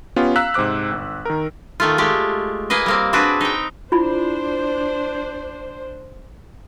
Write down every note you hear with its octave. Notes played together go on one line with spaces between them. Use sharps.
B3 C#4 F4 G4
F5 A#5 E6 F#6 B6
G#2 C3 C5 D6 F#6
G1
D#3 A#4
D#3 A3 F4
G#3 A3 G4
A#3 G#4 B4 D#5
G3 A#3 C4
C4 D4 F#4 G#4 B4
D#4 G5
D4 E4 F4 C5 B5